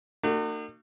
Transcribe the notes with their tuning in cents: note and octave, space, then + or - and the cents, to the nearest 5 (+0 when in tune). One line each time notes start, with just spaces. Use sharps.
A#3 -45 D#4 -45 F#4 +15